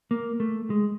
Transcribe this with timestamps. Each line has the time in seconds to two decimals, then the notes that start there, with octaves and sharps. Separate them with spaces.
0.11 A#3
0.40 A3
0.70 G#3